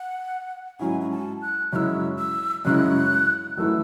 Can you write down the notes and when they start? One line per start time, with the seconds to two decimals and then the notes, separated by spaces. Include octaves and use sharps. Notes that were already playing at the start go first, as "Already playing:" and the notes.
Already playing: F#5
0.79 G#2 F#3 C#4 E4 G#5
1.01 G#5
1.11 A5
1.42 F#6
1.72 F#2 C#3 G#3 C#4 E4 E6 F#6
2.18 E6
2.65 F#2 C#3 G#3 C#4 E4 F#6
3.57 G#1 F#2 E3 A3 E4 E6